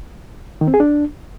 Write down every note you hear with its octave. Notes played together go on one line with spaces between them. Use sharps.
D#3
C4
G#4
D4